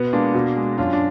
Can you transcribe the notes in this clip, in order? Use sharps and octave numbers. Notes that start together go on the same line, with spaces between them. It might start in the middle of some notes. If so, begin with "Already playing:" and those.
Already playing: B2 B3
G#3 A#3 D4
B2
G#3
F#2 D4 F4
D4